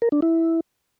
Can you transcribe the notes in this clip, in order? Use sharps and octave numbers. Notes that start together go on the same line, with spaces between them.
A#4
D4
E4